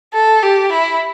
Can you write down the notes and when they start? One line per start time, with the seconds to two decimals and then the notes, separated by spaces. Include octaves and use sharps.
0.13 A4
0.43 G4
0.72 E4